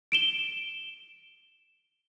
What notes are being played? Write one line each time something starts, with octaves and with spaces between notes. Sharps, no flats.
D7 E7 G7